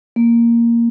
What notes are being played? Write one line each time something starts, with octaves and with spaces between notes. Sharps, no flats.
A#3